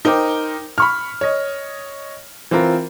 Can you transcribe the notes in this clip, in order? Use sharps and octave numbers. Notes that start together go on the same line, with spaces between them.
D#4 A#4 C5 G5 D6
B5 C#6 F6
C#5 D#5
E3 C4 F4 A#4